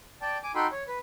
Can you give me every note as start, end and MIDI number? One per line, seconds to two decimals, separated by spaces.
0.22 0.38 74
0.22 0.38 79
0.22 0.38 81
0.43 0.52 80
0.43 0.52 86
0.55 0.67 63
0.55 0.67 66
0.55 0.67 69
0.55 0.67 79
0.55 0.67 83
0.55 0.67 84
0.72 0.84 73
0.88 0.99 71